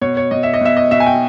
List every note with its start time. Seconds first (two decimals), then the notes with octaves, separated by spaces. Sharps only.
0.01 B2 C#5
0.17 C#5
0.31 B2 D#5
0.43 E5
0.53 D#5
0.61 B2 E5
0.76 D#5
0.91 B2 E5
1.00 G#5
1.06 G5